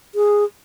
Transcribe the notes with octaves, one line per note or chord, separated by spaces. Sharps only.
G#4